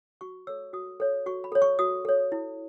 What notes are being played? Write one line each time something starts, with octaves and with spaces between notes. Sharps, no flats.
F#4 C#6
A4 C#5 E6
F#4 D#6
A4 C#5
F#4 C#6
B5
A4 C#5
C#6
F#4 D#6
A4 C#5
E4